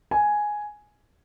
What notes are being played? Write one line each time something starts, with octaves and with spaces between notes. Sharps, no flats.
G#5